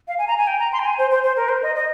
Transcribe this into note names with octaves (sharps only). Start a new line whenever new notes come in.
F5
G#5
A#5
G#5
G5
A#5
C6
G5
G#5
C5
C5
C5
A#4
C5
D#5
D#5